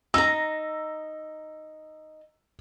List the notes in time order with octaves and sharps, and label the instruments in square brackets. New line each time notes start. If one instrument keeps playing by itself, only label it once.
[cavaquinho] D#4 A#5 [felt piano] E6